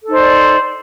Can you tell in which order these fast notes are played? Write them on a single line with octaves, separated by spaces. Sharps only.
A4 D#4 C5 D5